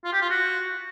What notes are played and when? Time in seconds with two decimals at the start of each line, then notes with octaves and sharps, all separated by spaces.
0.04 F4
0.13 G4
0.21 F4
0.30 F#4